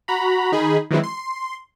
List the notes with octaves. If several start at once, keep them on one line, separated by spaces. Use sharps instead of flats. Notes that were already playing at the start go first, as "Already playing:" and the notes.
F#4 A#5 B5
D#3 D#4 G#4 B5
D#3 E3 F#3 G#3 C4 E4
C6